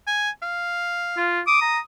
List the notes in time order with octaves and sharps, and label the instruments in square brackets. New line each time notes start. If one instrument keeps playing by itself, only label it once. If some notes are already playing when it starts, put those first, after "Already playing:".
[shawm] G#5
F5
[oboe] F4
[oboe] D6 [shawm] D#6
[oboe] A#5